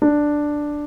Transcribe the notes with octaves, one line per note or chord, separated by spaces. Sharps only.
D4